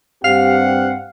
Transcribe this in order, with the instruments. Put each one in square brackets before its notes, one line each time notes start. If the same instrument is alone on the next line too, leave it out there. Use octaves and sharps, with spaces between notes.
[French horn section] G2 G4 [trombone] C4 [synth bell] F5 F6 C7 [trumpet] F#5